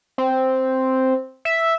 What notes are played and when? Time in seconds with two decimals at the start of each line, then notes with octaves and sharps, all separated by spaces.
0.18 C4
1.45 E5